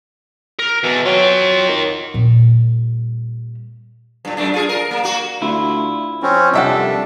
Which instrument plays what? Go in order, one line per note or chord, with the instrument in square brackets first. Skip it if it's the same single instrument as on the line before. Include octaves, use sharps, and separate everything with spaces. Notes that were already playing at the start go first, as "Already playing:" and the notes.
[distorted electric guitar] A#4
[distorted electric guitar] E2 [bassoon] B2
[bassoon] F#3 [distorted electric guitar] F4 G5
[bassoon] D#3
[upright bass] A#2 G3
[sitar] G2 A#2
F#2 A3 D4
F4 G#4
A#4
A#3
A#3 F#4
[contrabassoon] D2 [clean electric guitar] E4 F4
[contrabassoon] F2 [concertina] C4 C#4
[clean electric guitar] C2 G3 A4 [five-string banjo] D#3 E5 F#5 [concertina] D4